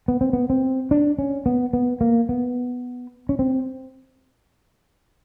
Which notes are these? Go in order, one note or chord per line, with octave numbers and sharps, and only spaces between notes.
B3
C4
B3
C4
D4
C#4
B3
B3
A#3
B3
C#4
C4